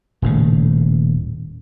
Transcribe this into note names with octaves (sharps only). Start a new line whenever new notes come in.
D#1 A2 C#3